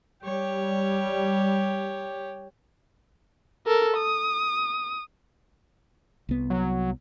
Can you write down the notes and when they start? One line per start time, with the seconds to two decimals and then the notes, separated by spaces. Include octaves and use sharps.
0.24 G3 G4 C#5
3.66 A4 A#4
3.97 D#6
6.29 C2 B3
6.50 F#3